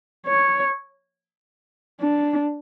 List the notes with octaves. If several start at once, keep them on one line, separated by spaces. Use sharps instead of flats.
C#5
D4